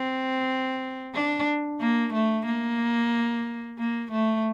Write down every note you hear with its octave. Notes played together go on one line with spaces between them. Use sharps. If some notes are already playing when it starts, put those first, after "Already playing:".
Already playing: C4
D4
A#3
A3
A#3
A#3
A3